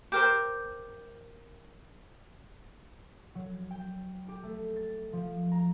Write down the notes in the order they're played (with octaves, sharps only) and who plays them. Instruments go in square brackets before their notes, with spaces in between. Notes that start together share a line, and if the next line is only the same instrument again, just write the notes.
[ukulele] G4 A#4 C5
[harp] F#3
G5
G4
A3
A6
F3
A#5